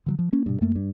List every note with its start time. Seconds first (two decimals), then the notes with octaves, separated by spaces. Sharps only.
0.06 D3 E3 F#3
0.19 F3
0.33 A#3 C#4
0.46 G2 B2
0.61 F#2 A3 A#3
0.75 G2